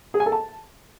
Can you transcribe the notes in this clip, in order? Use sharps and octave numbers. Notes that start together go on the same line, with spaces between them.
G#4
G#5
A4
A5